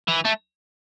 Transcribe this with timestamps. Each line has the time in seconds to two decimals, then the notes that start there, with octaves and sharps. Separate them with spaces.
0.08 E3
0.25 A3